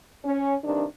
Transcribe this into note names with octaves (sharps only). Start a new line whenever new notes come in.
C#4
G2 C3 D#3 D4